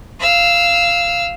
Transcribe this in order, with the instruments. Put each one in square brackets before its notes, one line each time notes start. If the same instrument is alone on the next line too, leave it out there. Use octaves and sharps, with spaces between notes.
[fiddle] F5 E6